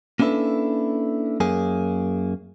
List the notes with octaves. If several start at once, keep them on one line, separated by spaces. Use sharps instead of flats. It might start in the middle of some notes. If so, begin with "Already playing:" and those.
A#3 C#4 D4 E4 A4 B4
F#2 A#3 G#4